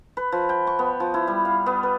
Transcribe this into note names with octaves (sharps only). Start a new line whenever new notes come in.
B4
F3
G5
C#6
B3
F3
E4
G3
F5
B3
B4